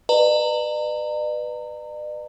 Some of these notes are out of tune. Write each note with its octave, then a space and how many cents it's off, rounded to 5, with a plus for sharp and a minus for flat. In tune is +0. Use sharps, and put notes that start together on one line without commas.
B4 +0 D5 +45 A#5 -30